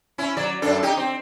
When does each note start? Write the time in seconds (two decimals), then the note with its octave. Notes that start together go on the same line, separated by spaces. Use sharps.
0.18 C#4 E4
0.37 F#3 D5
0.62 F#2 D4 A4
0.83 D#4 G4
0.97 C4